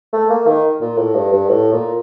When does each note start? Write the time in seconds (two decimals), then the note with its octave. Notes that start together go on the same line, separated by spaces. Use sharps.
0.13 A3
0.30 A#3
0.47 D#3
0.81 A#2
0.98 A2
1.15 G2
1.32 G2
1.49 A2
1.73 A#2